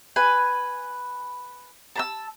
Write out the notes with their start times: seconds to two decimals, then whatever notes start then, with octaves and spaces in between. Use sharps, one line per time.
0.16 B4 G#5
1.96 A5 A#5 E6